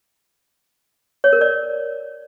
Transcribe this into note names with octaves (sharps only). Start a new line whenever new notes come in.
C#5
A#4
D5